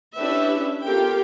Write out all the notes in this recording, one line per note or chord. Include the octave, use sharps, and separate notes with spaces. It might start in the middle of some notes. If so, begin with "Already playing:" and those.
C#4 D4 E4 G4 B4 E5
B3 F4 G4 A4 A#4 G5